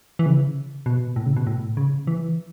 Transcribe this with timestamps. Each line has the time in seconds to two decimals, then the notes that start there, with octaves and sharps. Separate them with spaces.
0.19 E3
0.26 C#3
0.86 B2
1.16 A2
1.26 C#3
1.37 B2
1.47 A2
1.77 C#3
2.07 E3